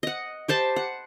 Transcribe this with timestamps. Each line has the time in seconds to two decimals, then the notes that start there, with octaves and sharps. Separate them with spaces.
0.03 D#5 F#5
0.48 G4 C5 A5 B5
0.76 F#5